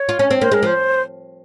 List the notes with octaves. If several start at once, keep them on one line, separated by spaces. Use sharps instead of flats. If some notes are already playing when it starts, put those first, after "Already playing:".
Already playing: C#5
F4
C#4
C4
A#3 C5
G#3 A#4
F3 C5